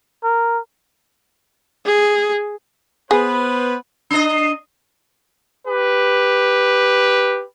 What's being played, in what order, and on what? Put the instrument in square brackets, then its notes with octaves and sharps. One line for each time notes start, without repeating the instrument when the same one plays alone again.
[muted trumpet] A#4
[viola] G#4
[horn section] B3 B4 C5 [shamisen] G#4
[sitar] D4 D#5
[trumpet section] G4 B4